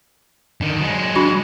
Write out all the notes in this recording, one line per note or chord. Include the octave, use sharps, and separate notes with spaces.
D3 D#3
F#3 G#3
D4 F#4 B5